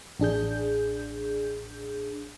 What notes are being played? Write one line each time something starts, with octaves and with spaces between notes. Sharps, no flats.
A1 D4 G#4 G6